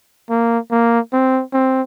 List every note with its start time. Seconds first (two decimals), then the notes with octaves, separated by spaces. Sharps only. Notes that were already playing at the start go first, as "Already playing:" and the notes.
0.30 A#3
0.71 A#3
1.13 C4
1.53 C4